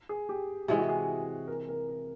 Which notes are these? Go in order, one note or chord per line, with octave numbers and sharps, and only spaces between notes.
G#4
G4
C3 E3 G#3 F#4
F#4
G#4
A#4
A#4
A#4